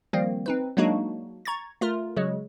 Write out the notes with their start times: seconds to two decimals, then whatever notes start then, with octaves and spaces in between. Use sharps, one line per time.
0.13 D#3 F3 G3 A#3 C4
0.46 C4 D#4 B4
0.77 F#3 G#3 A#3 D4 D#4 F#4
1.45 A#5 C#6 G#6 A6
1.81 A3 F4 A#4
2.17 C#3 F#3 G#3